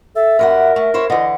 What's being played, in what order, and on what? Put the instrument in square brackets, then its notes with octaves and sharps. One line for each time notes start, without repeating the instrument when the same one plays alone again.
[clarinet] A4 [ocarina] E5
[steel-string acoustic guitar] F#2 G3 F#5 [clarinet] A#4
[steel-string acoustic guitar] A3
E4 C5 C#5
[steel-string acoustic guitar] D3 E3 [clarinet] D#5